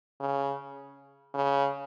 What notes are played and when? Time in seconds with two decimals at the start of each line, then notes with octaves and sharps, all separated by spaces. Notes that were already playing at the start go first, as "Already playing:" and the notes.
0.20 C#3
1.34 C#3